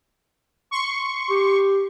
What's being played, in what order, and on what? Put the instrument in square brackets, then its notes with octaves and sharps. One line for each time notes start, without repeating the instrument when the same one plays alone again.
[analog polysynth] C6 C#6
[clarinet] G4